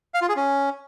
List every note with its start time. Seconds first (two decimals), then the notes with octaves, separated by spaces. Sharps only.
0.14 F5
0.22 F4
0.29 G#4
0.36 C#4